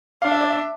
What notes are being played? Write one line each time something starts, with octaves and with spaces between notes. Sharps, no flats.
D4 F5
E5
D5
E5